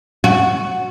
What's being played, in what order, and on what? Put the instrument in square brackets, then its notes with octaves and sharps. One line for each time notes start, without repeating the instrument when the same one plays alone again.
[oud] F#4